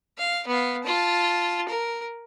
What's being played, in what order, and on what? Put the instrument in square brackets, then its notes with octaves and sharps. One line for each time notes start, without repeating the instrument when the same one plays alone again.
[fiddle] F5
B3 F5
F4 A5
A#4